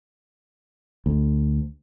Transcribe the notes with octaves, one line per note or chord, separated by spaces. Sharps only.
D2